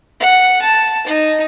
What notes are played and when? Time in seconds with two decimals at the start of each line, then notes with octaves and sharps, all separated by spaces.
0.20 F#5
0.62 A5
1.07 D#4